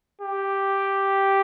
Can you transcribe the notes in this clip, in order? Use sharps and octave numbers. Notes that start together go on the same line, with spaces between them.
G4